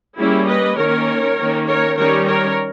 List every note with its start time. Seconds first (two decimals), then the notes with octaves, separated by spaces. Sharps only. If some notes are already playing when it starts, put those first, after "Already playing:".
0.18 G3 A#3 C#4 E4 G#4
0.47 B4 D#5
0.77 D#3 A#3 C#4 A#4 C#5
1.37 D#3 A#3 C#4
1.66 A#4 C#5
1.96 D#3 G3 C#4 A#4 C#5
2.26 A#4 C#5